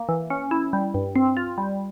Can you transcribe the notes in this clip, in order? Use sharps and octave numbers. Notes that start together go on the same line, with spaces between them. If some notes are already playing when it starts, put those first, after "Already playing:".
Already playing: A#3
E3
C#4
E4
G3
G2
C4
F4
G3